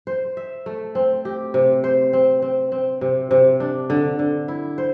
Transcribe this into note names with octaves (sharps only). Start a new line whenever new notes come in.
C5
E5
A3
C4
G4
C3
C5
C4
C4
C4
C3
C3
D4
D3
D3
E4
C5